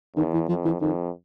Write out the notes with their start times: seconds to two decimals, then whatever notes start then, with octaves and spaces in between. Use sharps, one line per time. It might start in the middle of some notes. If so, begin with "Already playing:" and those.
0.16 E2 D#3
0.33 E3
0.49 F2 F3
0.65 E3
0.81 F2 D#3